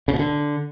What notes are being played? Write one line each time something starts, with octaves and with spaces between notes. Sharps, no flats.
C#3
B2
D3